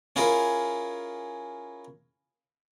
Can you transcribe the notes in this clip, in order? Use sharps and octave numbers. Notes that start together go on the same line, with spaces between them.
C#4 E4 F4 G#4 A#4